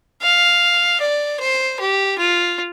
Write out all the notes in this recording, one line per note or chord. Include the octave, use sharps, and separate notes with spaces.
F5
D5
C5
G4
F4